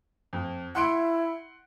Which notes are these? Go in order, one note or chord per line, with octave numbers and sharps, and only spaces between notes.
F2
E4 F#5 C6 D7